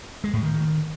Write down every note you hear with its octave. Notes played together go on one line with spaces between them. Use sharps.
G#3
A2
D#3